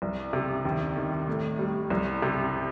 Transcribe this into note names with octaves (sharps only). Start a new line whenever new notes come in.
C2
C3
D#2
D#3
A2
G3
C2
C3